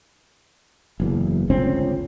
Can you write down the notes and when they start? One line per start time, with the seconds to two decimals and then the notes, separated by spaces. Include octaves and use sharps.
1.00 F#1 E2
1.50 G1 C#2 C4 C#4